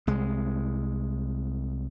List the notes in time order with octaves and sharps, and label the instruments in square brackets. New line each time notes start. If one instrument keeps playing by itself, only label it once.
[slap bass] C2 G#3